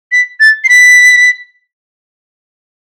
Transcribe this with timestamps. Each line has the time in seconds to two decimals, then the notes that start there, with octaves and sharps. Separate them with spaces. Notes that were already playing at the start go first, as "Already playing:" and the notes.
0.12 B6
0.40 A6
0.64 C7
0.69 B6